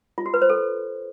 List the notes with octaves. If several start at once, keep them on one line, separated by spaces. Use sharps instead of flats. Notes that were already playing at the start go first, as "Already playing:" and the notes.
F4
F#4
B4
C5
A4